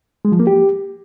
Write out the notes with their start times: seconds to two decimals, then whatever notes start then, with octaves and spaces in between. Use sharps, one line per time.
0.25 G#3
0.32 F3
0.40 A#3
0.47 G4